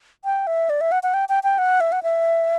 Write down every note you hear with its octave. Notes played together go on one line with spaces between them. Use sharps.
G5
E5
D5
E5
F#5
F#5
G5
G5
G5
F#5
E5
F#5
E5